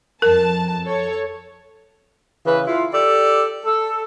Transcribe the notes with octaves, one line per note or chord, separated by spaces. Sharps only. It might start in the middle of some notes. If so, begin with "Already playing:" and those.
F2 A#4 A5
A4 C#5
C#3 E3 B4
E4 F4
G4 A4 D5
A4